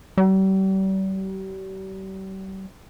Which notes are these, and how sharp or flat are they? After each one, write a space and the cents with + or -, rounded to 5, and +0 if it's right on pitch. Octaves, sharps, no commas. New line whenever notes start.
G3 -40